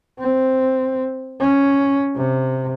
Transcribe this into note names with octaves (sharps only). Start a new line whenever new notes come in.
C4
C#4
C3